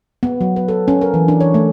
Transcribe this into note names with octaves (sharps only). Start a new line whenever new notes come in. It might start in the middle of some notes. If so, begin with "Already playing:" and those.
B3
F#3
B4
A4
C#4
A#4
E3
D4
C#5
A3